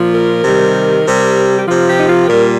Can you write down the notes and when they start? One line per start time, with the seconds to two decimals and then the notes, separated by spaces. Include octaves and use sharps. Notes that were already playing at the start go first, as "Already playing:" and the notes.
Already playing: A#2 F3
0.13 A#4
0.44 C3 D#3 G3
1.06 C3 G3
1.58 G4
1.68 C3 F3 F4
1.87 G4
1.99 D#4
2.09 F4
2.22 G4
2.28 A#2 G3 A#4